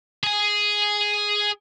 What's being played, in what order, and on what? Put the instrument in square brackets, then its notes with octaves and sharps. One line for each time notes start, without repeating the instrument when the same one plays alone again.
[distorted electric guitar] G#4 G#5